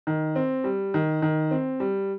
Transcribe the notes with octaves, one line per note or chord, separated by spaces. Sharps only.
D#3
C4
G3
D#3
D#3
C4
G3